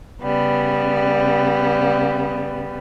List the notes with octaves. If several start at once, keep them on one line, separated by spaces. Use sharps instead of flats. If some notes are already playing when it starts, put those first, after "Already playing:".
C#3 G3 B3